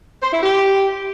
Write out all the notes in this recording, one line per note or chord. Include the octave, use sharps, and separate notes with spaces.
C5
E4
G4